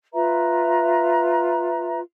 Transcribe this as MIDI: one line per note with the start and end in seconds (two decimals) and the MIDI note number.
0.13 2.00 65
0.13 2.00 71
0.13 2.00 76
0.13 2.00 82